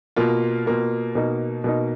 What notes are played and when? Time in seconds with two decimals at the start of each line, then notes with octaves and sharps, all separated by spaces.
0.16 B2 A#3 F4
0.66 B2 A#3 F4
1.15 B2 A#3 D#4
1.64 B2 A#3 D#4